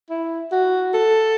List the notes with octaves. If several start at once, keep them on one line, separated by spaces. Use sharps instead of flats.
E4
F#4
A4